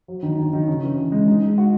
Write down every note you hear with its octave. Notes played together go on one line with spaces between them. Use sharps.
F#3
D#3
D#3
D#3
C#3
E3
C#3
G#3
D#4
G#3
F#4